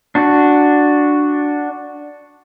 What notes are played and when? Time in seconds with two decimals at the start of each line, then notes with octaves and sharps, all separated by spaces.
0.15 D4 F#4